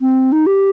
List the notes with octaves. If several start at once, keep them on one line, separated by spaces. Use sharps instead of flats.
C4
D#4
G4